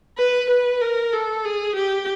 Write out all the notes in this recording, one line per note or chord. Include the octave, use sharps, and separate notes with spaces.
B4
B4
A#4
A4
G#4
G4